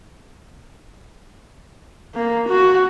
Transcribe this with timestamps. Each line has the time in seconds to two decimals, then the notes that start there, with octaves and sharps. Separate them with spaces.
2.15 A#3
2.49 F#4